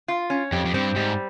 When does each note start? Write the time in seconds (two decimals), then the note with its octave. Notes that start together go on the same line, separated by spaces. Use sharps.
0.08 F4
0.30 C#4
0.52 F2 G4
0.65 F2
0.74 G2 C4
0.96 G#2 G3